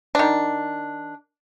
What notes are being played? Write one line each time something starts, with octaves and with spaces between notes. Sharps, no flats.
D#3 D4